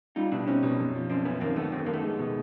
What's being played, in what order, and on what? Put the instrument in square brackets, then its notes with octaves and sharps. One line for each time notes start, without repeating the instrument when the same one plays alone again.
[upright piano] G3 [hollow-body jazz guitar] D#4 F4
[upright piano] B2 [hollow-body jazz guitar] D4 E4
[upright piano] C4 [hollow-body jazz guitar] C#4 D#4
[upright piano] B2
F#2
F3
[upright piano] F#2 [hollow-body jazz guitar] C4 D4
[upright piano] F#2 [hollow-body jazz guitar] B3 C#4
[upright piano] D#2 [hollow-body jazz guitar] A#3 C4
[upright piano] D#2 [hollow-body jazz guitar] A3 B3
[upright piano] D#2 [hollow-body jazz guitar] C4
[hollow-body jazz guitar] B3
[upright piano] D#2 [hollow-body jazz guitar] A#3
[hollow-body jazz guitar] A3 B3
[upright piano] G#3
B2